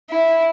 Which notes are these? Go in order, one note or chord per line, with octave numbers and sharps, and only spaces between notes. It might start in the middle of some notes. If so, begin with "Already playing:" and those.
E4